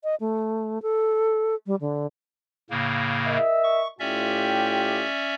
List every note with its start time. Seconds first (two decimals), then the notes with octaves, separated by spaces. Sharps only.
0.04 D#5
0.20 A3
0.82 A4
1.67 G3
1.81 D3
2.70 A2 C#3 A#3
3.27 A#4 D#5 E5
3.64 C#6
4.00 A2 C#4 F4 G4 D5 E5